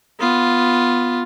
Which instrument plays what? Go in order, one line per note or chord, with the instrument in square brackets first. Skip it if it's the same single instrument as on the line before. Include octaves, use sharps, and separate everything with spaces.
[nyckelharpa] B3 F4